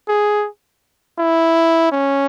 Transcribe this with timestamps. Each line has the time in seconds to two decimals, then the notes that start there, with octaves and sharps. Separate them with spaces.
0.09 G#4
1.19 E4
1.92 C#4